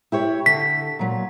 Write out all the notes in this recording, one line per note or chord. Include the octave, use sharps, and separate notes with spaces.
E4 G4 C#5
D3 B6
A#2 F#3